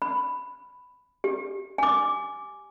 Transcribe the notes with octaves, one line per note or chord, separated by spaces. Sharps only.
B5
G4
G#5 D6